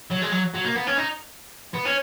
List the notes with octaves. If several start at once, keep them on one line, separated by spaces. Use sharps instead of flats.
F#3
G#3
F#3
F#3
A#3
B3
C#4
D#4
B3
C#4